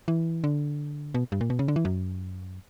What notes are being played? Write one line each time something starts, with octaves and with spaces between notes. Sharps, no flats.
E3
D3
B2
G2
A#2
B2
C#3
D3
E3
F#2